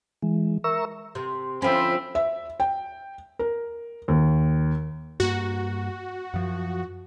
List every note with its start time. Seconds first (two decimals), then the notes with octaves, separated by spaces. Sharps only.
0.22 E3 G#3
0.64 A#4 E5 A#5 C#6 E6
1.15 C3
1.62 D2 F3 C4 C#4 E5 B5
2.15 E5
2.60 G5
3.39 A#4
4.08 D#2
5.20 G2 A#3 F#4
6.34 F#2 F3